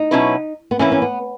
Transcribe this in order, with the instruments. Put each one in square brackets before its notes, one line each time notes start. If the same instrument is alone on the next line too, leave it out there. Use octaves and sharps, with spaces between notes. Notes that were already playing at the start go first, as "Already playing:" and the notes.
Already playing: [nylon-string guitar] D#4
[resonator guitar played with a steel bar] B2 F#3 C#4 E4 B4
[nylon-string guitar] B3
[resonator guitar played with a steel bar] E3 A#3 E4 B4 [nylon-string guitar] C#4
[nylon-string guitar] C#4
B3